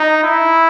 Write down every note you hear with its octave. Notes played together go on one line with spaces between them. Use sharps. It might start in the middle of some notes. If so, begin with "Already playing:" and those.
Already playing: D#4
E4